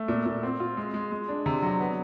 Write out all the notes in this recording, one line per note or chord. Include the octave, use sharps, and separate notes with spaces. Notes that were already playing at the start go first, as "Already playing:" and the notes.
Already playing: A3
A#2
A#2
C4
F4
G#3
G#3
G#3
D4
C3
F#3
B3